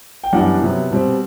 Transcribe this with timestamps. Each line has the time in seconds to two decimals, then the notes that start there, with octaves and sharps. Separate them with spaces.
0.24 G5
0.33 F#2 E3 G3 B3 D4 F#5
0.62 C3 F#3 B3
0.91 B2 G3 C4